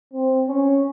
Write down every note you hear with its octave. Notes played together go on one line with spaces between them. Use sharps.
C4
C#4